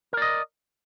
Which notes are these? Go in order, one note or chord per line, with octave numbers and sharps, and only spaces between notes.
A#4 D5 D#5